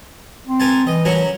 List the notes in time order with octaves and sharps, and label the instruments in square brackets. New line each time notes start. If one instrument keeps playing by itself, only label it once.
[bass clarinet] C4
[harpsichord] A#4 G#5 A5
[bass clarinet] E3 [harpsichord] D#5
[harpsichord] F#3 C#4 A#4